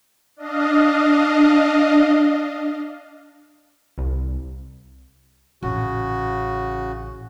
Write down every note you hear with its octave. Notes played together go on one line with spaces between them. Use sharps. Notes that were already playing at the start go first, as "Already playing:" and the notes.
D4 D#5 F5
C2
A1 C#3 F#4